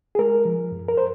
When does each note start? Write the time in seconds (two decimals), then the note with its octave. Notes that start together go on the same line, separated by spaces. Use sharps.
0.15 G#4
0.19 G#3 A#4
0.45 F3
0.72 F#2
0.88 A#4
0.97 C5